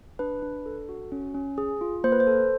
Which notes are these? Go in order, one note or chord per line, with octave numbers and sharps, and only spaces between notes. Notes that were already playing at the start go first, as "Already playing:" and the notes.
D4 B4
D4
A4
F#4
C#4
C#4
G#4
F4
A#3 C5
B4
C5
A4